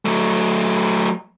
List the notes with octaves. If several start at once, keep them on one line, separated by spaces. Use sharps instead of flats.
F#3 A3